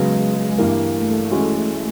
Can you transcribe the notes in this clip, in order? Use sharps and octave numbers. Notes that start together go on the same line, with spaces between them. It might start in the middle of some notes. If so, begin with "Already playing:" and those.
Already playing: C#3 F#3 G#3 B3
G2 E3 G3 A#3
A3
E3 G#3 C#4 F#4